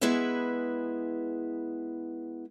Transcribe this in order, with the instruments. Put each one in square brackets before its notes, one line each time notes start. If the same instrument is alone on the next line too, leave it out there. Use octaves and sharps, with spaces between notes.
[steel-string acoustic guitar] G#3 B3 E4 G#4 B4 E5